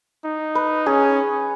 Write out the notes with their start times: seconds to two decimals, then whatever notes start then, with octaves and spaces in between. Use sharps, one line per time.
0.24 D#4
0.55 B4
0.86 C#4 G#4